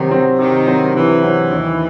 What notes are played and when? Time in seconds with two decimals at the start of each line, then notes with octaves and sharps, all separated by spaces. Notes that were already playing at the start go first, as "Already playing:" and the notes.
Already playing: C3 D#3 F#3 C4
0.10 F#3 C4
0.39 C3 D#3
0.67 F#3 C4
0.95 C3 E3
1.23 F#3 C4
1.52 D#2